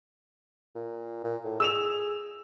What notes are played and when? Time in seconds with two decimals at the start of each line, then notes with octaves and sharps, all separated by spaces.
0.75 A#2
1.24 A#2
1.44 A2
1.60 G#4 E6 E7 F7